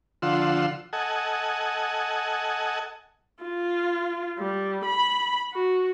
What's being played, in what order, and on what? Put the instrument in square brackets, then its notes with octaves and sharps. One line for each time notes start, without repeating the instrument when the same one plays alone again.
[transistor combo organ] D3 F3 F4 F#5 C6 E6
A4 D#5 F#5 G#5
[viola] F4
G3
B5
F#4